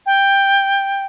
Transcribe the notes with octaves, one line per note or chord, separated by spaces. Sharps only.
G5